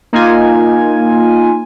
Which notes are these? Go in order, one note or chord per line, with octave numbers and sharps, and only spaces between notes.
A#3 D#4 F4 G#5